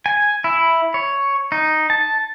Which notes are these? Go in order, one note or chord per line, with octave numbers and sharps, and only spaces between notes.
G#5
E4
C#5
D#4
A5